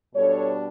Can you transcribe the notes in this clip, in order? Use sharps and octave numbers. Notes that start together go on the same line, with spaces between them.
B2 G3 D4 A4 C#5